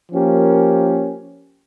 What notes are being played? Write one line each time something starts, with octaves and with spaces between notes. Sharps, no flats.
F3 A#3 C#4 G4 A#4